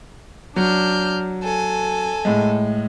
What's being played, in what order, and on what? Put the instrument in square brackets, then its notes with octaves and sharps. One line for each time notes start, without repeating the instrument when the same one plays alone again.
[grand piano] F#3 [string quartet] D4 F6 G6
[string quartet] A4 G#5
[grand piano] A2 G#3